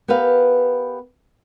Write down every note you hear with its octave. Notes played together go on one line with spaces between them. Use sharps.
B3 G4 A#4 B4 F5